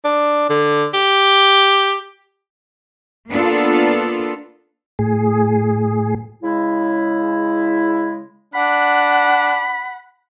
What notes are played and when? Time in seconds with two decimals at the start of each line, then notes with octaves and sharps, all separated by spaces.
0.05 D4
0.50 D3
0.94 G4
3.31 A#3 B3 D4 F4 A4
4.99 A2 G#4
6.43 C#3 G#3 E4
8.54 D4 F#5 B5